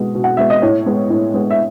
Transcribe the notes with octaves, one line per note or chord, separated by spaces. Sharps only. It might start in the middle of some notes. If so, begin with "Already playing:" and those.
Already playing: B2 G#3 B3
B2
F#5
G#3 B3 E5
D#5
A2 C#5
G#3 B3
A2
G#3 B3
E5